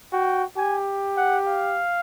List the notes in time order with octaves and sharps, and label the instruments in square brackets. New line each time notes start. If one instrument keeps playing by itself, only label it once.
[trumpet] F#4 [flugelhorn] G5
[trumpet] G4 [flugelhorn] G#5
[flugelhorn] F#5
F5